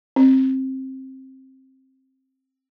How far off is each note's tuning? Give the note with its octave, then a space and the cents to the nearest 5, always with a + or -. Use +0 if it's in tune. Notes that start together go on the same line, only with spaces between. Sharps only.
C4 +15